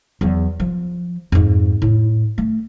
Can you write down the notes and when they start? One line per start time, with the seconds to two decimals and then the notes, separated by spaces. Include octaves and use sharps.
0.21 E2 F#3
0.60 F3
1.32 F2 G#2
1.82 A2
2.38 A3